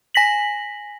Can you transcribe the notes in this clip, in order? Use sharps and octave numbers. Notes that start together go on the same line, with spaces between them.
G#5 A#6 B6 F#7